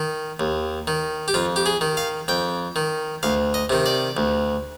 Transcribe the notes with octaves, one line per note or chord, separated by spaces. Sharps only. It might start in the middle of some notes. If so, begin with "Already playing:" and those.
Already playing: D#3
D#2
D#3
G4
F2 F4
G4
G#4
D#3
F5
F2 G5
D#3
D2 F5
D#5
C3 D#3
D5
D2